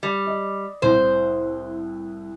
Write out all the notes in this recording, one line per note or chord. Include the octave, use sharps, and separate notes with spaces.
G3
D#5
C2 A2 C5